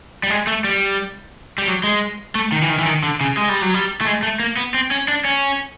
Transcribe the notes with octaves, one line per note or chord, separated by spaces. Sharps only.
G3
G#3
A3
G3
G3
F#3
G#3
A3
D#3
E3
D#3
E3
D#3
D3
C#3
G#3
G3
F#3
G3
A3
G#3
A3
A#3
B3
C4
C#4
D4
C#4